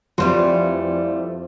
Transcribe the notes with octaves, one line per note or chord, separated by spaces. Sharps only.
F2 E3 G3 A3 F4 C6